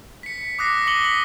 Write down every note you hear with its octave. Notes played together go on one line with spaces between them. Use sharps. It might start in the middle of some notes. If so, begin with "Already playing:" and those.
B6 C#7
D6 D#6 F#6 A#6 C7
C#6 A#6 C#7 F#7 G7
B6 F#7